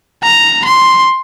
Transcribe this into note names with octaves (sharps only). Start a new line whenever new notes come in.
A#5
C6